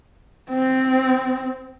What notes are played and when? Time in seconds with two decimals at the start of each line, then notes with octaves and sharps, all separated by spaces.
0.50 C4